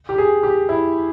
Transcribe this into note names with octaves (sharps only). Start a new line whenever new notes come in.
G4
G#4
G4
E4